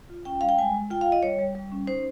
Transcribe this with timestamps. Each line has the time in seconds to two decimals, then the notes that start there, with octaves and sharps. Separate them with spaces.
0.10 F4
0.25 C#4 G5
0.41 G3 F5
0.49 G5
0.59 G#3 G#5
0.74 G#3
0.90 F4 G5
1.01 F5
1.06 F4
1.12 D#5
1.23 G3 C#5
1.39 G3
1.55 G3
1.72 C#4
1.87 D#4 C5